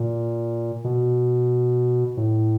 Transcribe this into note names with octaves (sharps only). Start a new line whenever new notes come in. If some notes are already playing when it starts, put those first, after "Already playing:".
Already playing: A#2
B2
A2